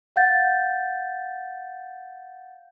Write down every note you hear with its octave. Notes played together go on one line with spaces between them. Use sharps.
F5 F#5 G6 A6